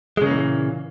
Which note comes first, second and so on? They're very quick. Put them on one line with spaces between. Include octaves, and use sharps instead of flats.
G#3 C#3 A#3 E3 A#2